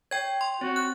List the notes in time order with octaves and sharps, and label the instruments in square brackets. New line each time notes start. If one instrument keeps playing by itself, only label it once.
[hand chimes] C#5 [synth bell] G5 G#6
[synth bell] C6
[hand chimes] C4 C#5 A6 [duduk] F#4
[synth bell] F#6